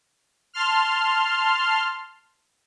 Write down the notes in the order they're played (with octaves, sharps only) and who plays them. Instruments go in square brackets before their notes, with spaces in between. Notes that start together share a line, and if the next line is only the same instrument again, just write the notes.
[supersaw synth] A5 C6 F6